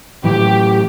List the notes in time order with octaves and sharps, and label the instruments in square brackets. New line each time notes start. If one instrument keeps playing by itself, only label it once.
[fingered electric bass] A2 E3 F#3 [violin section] G4